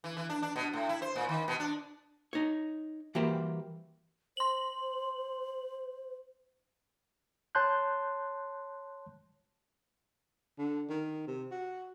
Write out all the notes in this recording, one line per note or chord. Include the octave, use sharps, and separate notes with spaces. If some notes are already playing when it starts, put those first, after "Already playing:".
E3
E3
D4
D4
B2
A2
E4
C5
A#2
D#3
B2
D4
D#4 C#5
E3 G3 A#3 F#4 G4 C5
C5 C6 F#7
C#5 A5 C6 F#6 G6
D3
D#3
C3
F#4